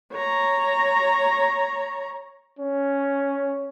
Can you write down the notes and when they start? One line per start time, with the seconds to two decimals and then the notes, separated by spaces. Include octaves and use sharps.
0.13 C#5 A#5
2.59 C#4